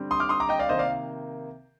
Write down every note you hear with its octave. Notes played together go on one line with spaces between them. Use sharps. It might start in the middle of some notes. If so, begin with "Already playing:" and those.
Already playing: D3 G3 C4
C6 D#6
D6 F6
C6 D#6
A#5 D6
D#5 G5
D5 F5
C3 D#3 A#3 C5 D#5
D5 F5